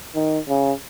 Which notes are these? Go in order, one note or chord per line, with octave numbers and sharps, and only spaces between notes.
D#3
C#3